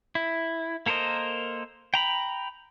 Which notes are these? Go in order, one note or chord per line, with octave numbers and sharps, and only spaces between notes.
E4
A#3 A4 A#4 C5 D#5
G5 A#5 B5